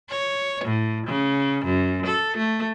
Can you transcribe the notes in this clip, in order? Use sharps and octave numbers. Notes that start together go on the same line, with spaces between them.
C#5
A2
C#3
F#2
A4
A3